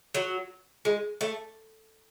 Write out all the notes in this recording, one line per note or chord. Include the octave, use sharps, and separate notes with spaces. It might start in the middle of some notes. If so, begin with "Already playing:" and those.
F#3
G#3
A3